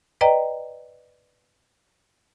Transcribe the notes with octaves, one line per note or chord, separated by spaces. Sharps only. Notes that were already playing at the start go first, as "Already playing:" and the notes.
B4 D5 D#5 G5 A#5